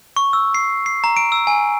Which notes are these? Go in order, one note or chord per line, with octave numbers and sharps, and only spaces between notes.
C#6
E6
C7
C7
A#5
D7
E6
G#5